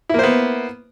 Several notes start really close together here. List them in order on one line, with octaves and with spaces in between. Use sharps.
E4 A#3 C5 B3